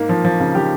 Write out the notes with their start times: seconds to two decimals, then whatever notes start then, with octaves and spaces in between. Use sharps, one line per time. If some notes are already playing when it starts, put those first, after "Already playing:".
Already playing: G#2 A#3
0.09 F3
0.25 F3
0.40 C#3
0.55 F3 G4